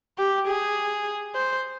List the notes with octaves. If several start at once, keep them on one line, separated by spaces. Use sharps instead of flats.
G4
G#4
C5